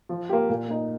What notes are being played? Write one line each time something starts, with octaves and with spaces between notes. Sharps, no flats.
F3
A#3 G4
A#2
A#3 D#4